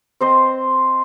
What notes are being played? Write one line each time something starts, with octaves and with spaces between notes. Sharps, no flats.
C4 C5 D#5